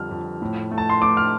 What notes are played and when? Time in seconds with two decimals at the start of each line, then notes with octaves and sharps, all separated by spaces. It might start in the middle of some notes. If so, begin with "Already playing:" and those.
Already playing: F2 D3 G3 F6
0.11 F2
0.42 A2
0.71 A3
0.78 A5
0.90 C6
1.02 A3 D6
1.17 F6